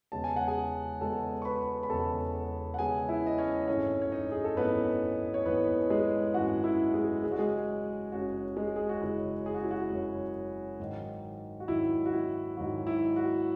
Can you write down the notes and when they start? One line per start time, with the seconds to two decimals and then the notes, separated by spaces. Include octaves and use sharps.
0.12 E1 E2 C#3 G#3 B3 A5
0.24 G#5
0.36 F#5
0.48 G#4 G#5
1.01 E1 E2 C#3 G#3 B3 A4 A5
1.42 C#6
1.45 B4 B5
1.83 B5
1.90 E1 E2 C#3 G#3 B3 A4 A5
2.74 F#5
2.79 E1 E2 C#3 G#3 B3 G#4 G#5
3.09 E4 E5
3.27 D#5
3.38 C#4 C#5
3.67 G#1 F#2 E3 A3 C#4 C#5
4.02 C#5
4.12 D#4 D#5
4.32 G#4
4.44 A4
4.57 G#1 F#2 E3 A3 B3 C#4 B4
5.34 C#5
5.45 G#1 F#2 E3 A3 B3 C#4 B4
5.90 G#3 G#4
6.34 G#1 F#2 E3 A3 C#4 F#4 F#5
6.64 E4 E5
6.94 G#3 G#4
7.23 F#1 F#2 C#3 G#3 G#4
7.31 F#4
7.39 G#3 G#4
8.12 F#1 F#2 C#3 G#3 F#4
8.57 G#3 G#4
8.76 G#4
8.89 F#4
9.01 F#1 F#2 C#3 G#3 E4
9.46 G#4
9.54 F#4
9.63 E4
9.71 F#4
9.90 F#1 F#2 C#3 G#3
10.80 G#2 D#3 F#3
11.60 F#4
11.68 G#2 D#3 F#3 E4
12.06 F#4
12.13 E4
12.57 G#2 D#3 F#3 F#4
12.87 E4
13.16 F#4